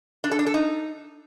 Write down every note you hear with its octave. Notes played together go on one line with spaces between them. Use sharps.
D4
A4
D4
A4
D#4